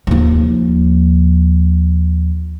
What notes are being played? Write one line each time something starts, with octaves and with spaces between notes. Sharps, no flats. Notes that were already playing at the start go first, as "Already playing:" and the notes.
D#2 F3